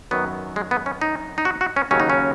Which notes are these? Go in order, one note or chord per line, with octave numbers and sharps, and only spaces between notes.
F#2 D#3 F#3 B3
G#3
B3
C#4
D#4
D#4
F#4
F#4
C#4
D#2 C#3 F#3 C#4
D#4
C#4